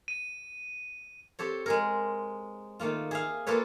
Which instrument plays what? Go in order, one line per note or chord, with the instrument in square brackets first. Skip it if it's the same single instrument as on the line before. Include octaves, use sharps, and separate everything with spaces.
[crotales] D#7
[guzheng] C4 G4 A4 C#5
G#3 G#4 A#4
D#3 A3 A#3 F4
G#4 E5 F5
A#3 F4 A4 B4 C#5